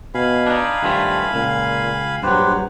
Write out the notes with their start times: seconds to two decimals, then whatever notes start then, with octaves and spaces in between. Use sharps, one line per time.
0.14 B2 F5 G#5 B5
0.47 D4 D#4
0.83 G2 D#3 F3 A3
1.34 C#2 A#2
2.23 A#1 G2 F#3 G4 B4 C5